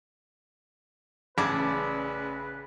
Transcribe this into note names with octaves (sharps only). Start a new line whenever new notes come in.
A1 C#3 B4 D5 G#5 A5